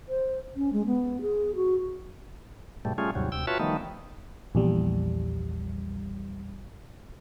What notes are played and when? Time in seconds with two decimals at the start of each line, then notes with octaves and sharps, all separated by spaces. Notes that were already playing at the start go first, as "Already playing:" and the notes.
0.09 C5
0.56 C#4
0.73 G#3
0.86 B3
1.21 G#4
1.55 F#4
2.85 G#2 B2 G3 A3
2.98 G3 A3 C#4 F4 G#4
3.15 D#2 G#2 C3 F#3 G3
3.32 D2 C3 G5 E6
3.47 F4 F#4 B4 C#5 E5 A5
3.59 D#3 F3 G3 A3 B3 D#4
4.55 A#1 E2 G3